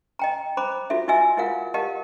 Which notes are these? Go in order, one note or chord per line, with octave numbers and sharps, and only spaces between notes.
D#5 G5 A#5
C5 A#5 B5 D6
F4 F#4 A4 E5
E4 F#4 D#5 E5 G#5 E6
E4 F4 G#4 A#4 F5 F#5
G4 A#4 D#5 F5 F#5 A5